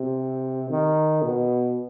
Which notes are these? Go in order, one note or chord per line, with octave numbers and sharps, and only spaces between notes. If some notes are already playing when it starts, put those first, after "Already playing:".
Already playing: C3
D#3
B2